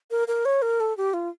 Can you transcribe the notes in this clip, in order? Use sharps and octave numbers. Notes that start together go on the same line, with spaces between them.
A#4
A#4
C#5
A#4
A4
G4
F4